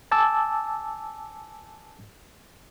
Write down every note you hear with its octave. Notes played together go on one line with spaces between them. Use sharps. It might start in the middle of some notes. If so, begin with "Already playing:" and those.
G#5 A5 D6 E6